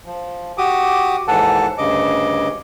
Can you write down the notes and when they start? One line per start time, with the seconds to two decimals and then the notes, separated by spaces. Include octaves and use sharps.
0.06 F3
0.58 F#4 G4 D6 D#6
1.28 D#2 G#2 E3 A4 F#5 A5
1.78 D2 G2 C#3 D#5 D6